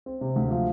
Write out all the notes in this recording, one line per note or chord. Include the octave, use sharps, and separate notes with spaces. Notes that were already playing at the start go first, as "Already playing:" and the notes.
C4
C3
D2
F3